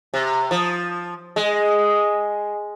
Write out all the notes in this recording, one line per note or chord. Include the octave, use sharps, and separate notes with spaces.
C3
F3
G#3